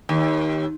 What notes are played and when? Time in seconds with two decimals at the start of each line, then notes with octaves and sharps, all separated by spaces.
0.09 D#2